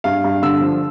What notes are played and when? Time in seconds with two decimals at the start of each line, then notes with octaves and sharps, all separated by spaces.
0.04 G2 F5
0.24 G2
0.42 D3 E6
0.61 F3